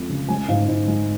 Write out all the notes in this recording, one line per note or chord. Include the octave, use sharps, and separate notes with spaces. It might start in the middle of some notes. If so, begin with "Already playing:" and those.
Already playing: F2 F3 G#3
C#3
G#3 G#5
G#2 F5
G#2
G#3